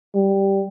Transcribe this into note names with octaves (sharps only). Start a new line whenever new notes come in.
G3